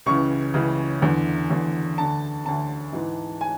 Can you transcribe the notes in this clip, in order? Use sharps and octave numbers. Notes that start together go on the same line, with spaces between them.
C#2 C#3 E3 C#6
C#2 C#3 E3
E2 D3
E2 D3
D2 D3 A5
D2 D3 A5
G#2 E3
G#5